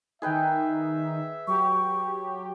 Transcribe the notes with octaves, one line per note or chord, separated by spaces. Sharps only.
D#3 D#4 G#4 B4 E5 G5
F#3 G4 C#6